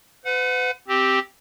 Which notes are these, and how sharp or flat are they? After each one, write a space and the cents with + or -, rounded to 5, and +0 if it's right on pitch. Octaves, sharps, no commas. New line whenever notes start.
B4 +40 F#5 -25
C4 +0 G4 -5